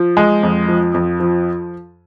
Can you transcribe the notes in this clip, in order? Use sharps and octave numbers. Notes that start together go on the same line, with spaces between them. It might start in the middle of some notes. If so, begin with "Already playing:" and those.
Already playing: F3
G#3
F2
F3
F2
F3